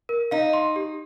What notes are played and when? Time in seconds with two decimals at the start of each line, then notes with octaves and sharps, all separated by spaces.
0.09 A#4
0.31 D#4 F5
0.53 C6
0.76 G4